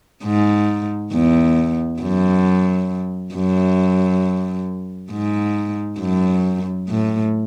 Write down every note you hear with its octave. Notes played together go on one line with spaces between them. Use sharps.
G#2
E2
F#2
F#2
G#2
F#2
A2